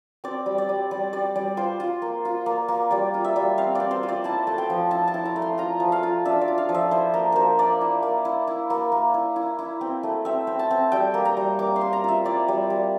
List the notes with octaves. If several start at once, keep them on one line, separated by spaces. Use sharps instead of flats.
C4 D5
G3
D5
G3
G3 D5
G3 D5
G3 D5
F4 C5
F4
A#3
F4
A#3
A#3
G3 D5
F4
E5
G3
C4 F5
C4 D5
C5
F4
D5
E4 A5
A3
G5
F3
E4 A5
A5
E4
A#5
A3
C6
F4 A#5
F3
F5
F4
D4 E5
D5
F4
F5
F3
E5
E4 C5
A#3 A#4
A#3 A#4 C5
A#3 D5
E4
A#3
E4
E4
A#3
A#3
E4
E4
E4
C4
A3
C4 E5
C4
A5
C4
G3 G5
A#3
A#5
G3
A#3 D6
C6
A#3
A#5
F4 E5
E4 D5
G3
G3